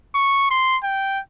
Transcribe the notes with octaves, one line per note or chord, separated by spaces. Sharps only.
C#6
C6
G5